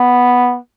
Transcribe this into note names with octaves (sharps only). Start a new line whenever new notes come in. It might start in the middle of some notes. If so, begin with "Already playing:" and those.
Already playing: B3